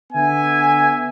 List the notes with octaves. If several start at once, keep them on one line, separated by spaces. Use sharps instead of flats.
D3 B3 E5 G#5